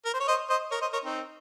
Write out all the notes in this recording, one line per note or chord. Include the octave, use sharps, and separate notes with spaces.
A#4
C5
C#5
C5 D#5
C5 D#5
A#4 C#5
C5 D#5
A#4 C#5
C4 D#4